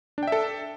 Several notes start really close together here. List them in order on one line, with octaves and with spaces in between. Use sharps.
D4 G5 E5 A4